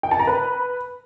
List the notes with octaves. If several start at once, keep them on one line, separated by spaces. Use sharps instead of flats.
G5
A5
A#5
B4